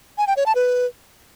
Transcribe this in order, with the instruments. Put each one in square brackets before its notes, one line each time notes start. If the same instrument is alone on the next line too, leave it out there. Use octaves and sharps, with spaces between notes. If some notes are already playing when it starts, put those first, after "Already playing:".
[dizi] G#5
G5
C#5
A5
B4